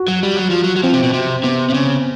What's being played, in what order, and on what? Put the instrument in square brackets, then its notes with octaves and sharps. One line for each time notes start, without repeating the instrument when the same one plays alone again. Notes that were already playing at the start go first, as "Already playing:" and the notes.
Already playing: [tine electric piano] F#4
[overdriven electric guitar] F#3
G3
F#3
F3
F#3
F#3
[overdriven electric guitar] F3 [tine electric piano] C4
[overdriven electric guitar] C3
B2
C3
[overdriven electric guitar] C3 [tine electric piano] B3
[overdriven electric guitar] C3
C#3